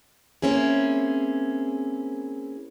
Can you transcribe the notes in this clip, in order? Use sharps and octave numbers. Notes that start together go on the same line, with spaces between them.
A#3 C4 C#4 E4 G#4